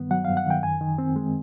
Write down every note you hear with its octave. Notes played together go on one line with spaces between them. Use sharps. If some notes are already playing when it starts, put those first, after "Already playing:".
Already playing: G2 D#3 G3 B3
F#3 F#5
F5
G2
F#5
D#3 G5
F#2 G#5
D#3
C4
G#3